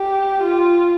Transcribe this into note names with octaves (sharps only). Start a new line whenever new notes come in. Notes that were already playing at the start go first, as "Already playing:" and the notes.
Already playing: G4
F4